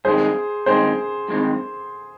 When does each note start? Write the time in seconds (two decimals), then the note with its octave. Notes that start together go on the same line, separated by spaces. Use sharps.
0.05 G2 D#3 G#3 C4 G#4 C5
0.66 G2 D#3 G#3 C4 G#4 C5
1.28 G2 D#3 G#3 C4